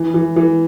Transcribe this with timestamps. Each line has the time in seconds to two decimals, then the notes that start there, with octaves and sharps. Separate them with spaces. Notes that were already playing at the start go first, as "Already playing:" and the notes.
Already playing: E3
0.14 E3
0.36 E3